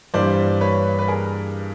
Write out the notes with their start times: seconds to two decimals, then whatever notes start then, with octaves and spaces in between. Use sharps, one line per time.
0.14 G2 E3 G3 A#3 C5 D5
0.61 B4 C#5
0.99 B4
1.08 G#4 A#4